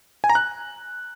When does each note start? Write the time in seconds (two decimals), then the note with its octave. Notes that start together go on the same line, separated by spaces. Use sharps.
0.24 G#5
0.30 A#5
0.35 F#6